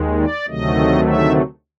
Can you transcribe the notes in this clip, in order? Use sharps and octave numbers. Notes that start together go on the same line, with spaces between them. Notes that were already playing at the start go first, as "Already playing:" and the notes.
Already playing: D#2 D#3 G#3
D5
D2 C3 D#3 F#3 A3 D#5
E5